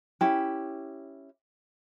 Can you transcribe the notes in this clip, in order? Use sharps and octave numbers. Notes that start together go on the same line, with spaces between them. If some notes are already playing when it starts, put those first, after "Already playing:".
C#4 E4 G4